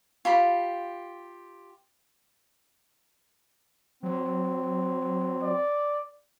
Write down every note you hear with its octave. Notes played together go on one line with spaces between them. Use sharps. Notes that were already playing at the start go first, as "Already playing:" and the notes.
F4 G4 B5
F#3 C4
D5